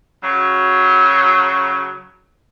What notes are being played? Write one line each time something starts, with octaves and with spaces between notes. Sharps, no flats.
C#3 F#3